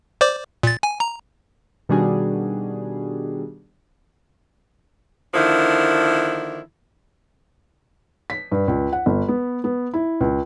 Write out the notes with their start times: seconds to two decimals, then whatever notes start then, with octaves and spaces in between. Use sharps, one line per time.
0.21 C5 D5 D6
0.63 A#2 A6
0.83 G#5
1.00 A#5
1.89 B2 D#3 G3 D4 F#4 G#4
5.34 D3 D#3 F3 A#3 E4
8.30 B6
8.52 G2
8.68 C#2
8.93 F#5
9.06 G1
9.28 B3
9.64 B3
9.94 E4
10.21 C#2